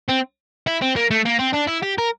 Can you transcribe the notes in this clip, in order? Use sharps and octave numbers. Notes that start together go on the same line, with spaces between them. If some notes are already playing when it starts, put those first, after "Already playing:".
C4
E4
C4
A#3
A3
A#3
C4
D4
E4
G4
A#4